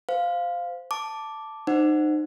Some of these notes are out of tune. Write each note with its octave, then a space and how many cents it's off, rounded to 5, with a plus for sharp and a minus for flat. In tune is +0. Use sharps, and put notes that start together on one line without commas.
C5 -20 F5 +0
A5 +0 D6 +0
D#4 -30 C5 +0 F#5 +0